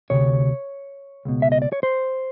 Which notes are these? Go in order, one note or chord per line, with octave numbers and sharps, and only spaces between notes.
D2 C3 C#5
C#2 B2
E5
D#5
D5
C#5
C5